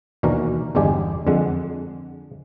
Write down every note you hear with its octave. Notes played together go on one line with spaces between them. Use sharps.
D#2 B2 E3 D4 F#4 A#4
G1 E2 G#3 D4 G4 G#4
F2 D3 G#3 F#5